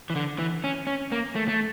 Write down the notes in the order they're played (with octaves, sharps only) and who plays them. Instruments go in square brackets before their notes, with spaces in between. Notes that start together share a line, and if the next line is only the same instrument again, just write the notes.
[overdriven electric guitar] E3
D3
E3
C#4
C#4
A#3
A3
A3